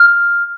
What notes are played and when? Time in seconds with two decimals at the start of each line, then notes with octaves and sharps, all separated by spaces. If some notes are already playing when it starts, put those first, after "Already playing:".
Already playing: F6